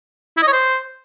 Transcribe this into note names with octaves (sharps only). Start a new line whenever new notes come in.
E4
D#5
C#5
C5